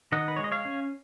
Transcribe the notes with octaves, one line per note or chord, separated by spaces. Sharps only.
D#3 D#5 F#5
B4
G#3 C#5
D#5
C#5 F5
C#4